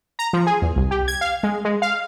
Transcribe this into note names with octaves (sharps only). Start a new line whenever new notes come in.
A#5
F3
G#4
E2
C2
G4
G#6
F5
G#3
G#3
F5